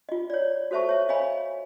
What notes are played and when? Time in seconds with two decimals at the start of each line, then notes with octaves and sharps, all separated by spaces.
0.09 F4 D#5
0.30 C#5 D5
0.71 F#4 A4 C5 E5 A5 C#6
0.89 C#5 E5
1.09 C#5 D#5 F5 G#5 B5